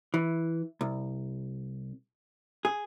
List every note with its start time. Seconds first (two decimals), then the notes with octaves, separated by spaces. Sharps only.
0.14 E3
0.81 C2
2.65 G#4